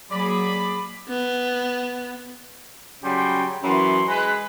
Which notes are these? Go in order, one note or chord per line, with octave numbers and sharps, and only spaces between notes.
F#3 A#3 G#4 D5 B5
B3
C#3 F#3 G3 G5 B5 C6
F#2 E3 F#3 B5 C6
G#3 B4